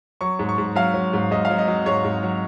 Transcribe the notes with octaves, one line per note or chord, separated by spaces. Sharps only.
F#3 C#6
G#2
C#6
G#2
F#3 F5
F#3
G#2
G#2 D#5
F5
F#3
D#5
F#3
G#2 C#5
G#2
F#3